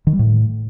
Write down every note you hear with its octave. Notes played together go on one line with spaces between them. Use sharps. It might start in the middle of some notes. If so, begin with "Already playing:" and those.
D#3
G3
A2